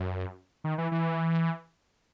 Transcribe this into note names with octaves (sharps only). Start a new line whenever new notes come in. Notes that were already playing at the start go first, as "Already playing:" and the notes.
Already playing: F#2
D#3
E3
E3